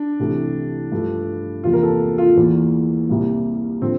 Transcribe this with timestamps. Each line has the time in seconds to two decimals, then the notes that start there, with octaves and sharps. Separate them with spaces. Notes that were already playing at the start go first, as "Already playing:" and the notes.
Already playing: D4
0.19 C2 C3 E3 A3
0.92 G2 F3 A3
1.64 E2 C3 F3 A#3 F4
1.73 A#4
1.83 A4
2.18 F4
2.37 E2 E3 A#3
3.09 C2 C3 G3 A#3
3.82 D3 F3 C4